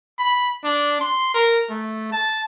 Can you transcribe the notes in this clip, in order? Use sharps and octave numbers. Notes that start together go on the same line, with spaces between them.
B5
D4
C6
A#4
A3
A5